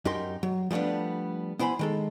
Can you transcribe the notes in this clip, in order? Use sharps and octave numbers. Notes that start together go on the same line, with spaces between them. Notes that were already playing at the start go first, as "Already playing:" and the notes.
F#2 D#4 G4 A#4 G5 C6
F#3
F3 G3 A3 B3 D4
B3 E4 C5 G#5 B5
D#3 G#3 A4